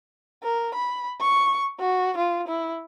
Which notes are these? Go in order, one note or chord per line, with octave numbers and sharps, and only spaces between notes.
A#4
B5
C#6
F#4
F4
E4